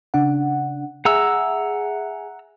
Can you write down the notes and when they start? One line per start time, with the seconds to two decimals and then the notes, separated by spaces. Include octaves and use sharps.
0.14 C#3 D4 F#5
1.05 G#4 E5 F#5 G#5 A#5 E6